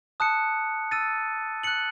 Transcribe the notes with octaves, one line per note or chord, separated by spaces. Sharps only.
A5 D#6 F#6 C#7
E6 A6 D#7
F#6 C#7 F#7